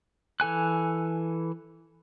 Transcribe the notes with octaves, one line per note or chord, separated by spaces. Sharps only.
E3 A4 G#5 F#6